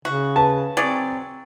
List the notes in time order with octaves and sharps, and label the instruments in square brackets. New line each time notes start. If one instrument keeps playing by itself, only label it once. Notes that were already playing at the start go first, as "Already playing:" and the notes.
[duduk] C#3 [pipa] F#4
[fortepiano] B4 A5
[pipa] F#3 G#4 D5 [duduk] C4